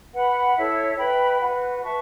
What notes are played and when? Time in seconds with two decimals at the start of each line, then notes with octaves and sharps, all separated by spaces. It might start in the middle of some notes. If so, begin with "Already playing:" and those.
0.13 B4 F#5 B5
0.55 E4 A4 C#5 E5
0.97 B4 E5 G5 B5
1.39 F#4 B4 F#5
1.82 B4 E5 A5 C#6